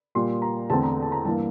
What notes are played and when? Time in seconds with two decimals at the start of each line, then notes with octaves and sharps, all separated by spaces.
0.15 A#2 G3 A#3 C6
0.42 A#5
0.70 E2 D3 A3 C4 A5
0.83 A#5
1.02 A5
1.12 A#5
1.25 G2 E3 A#3 A5